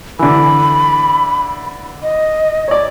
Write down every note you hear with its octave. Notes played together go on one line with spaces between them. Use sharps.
D3 E3 B5
D#5
C#5 D5